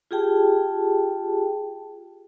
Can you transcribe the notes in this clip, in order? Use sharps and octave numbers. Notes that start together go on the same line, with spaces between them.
F4 G4 G#4 G5 A5